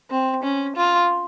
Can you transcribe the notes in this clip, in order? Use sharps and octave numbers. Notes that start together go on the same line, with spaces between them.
C4
C#4
F4